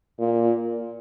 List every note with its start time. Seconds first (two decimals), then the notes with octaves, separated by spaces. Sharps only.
0.19 A#2